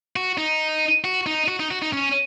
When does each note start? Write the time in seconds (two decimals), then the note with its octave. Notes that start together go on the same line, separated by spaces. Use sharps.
0.16 F#4
0.38 D#4
1.04 F#4
1.27 D#4
1.48 F#4
1.60 D#4
1.70 F#4
1.82 D#4
1.93 C#4